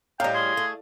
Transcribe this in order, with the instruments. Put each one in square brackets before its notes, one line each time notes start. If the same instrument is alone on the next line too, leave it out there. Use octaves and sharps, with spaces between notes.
[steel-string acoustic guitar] A2 G3 [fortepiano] D#5 F5 [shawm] G5 [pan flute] A#5
[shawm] G#4 [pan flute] C6
[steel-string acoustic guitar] A3